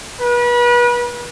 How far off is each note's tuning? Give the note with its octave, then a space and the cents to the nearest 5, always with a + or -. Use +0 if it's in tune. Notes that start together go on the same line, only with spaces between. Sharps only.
B4 -35